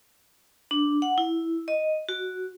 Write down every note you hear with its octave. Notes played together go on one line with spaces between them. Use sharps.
D4
F#5
E4
D#5
F#4